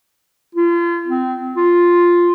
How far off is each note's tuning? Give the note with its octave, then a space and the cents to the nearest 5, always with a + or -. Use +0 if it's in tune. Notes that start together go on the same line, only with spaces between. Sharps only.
F4 -35
C4 -25
F4 +0